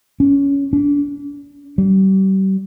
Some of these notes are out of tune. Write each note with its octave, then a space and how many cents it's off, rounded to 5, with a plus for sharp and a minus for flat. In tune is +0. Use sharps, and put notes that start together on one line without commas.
C#4 +15
D4 -40
G3 -35